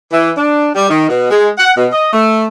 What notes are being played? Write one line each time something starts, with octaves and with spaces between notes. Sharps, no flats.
E3
D4
G3
D#3
B2
G#3
F#5
B2
D#5
A3